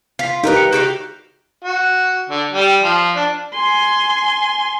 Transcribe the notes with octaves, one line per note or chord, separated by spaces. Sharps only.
F4 F5 B6
D#4 G4 A#4 B4
C#7
F#4 G4 F5 G6
F#4
D3
G3
F3
D4
G#5 C6